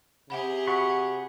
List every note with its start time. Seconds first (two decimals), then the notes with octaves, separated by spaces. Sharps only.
0.30 C3 G4 G#4 E5 F#5 B5
0.67 F#4 F#5 B5 C#6